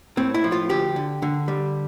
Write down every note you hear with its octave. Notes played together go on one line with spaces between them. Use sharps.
A2 C4
E4
F3
F4
D2 G4
D3
D3
G3